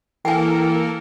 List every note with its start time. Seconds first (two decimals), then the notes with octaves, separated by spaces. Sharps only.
0.25 E3 A#3 A4 A#4 G5 G#5